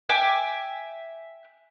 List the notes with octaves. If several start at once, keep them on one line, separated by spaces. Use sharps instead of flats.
E5 G5 G#5 D6